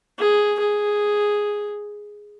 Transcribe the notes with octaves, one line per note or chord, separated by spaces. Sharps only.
G#4
G#4